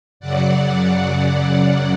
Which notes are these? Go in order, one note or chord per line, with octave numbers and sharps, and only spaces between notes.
F#2 C#3 F#3 D5 F#5